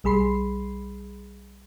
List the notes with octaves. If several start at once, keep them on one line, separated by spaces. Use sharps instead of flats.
B1 G3 G#4 B5 C6 C7